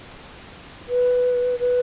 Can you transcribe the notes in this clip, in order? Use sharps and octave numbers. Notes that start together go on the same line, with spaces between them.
B4
B4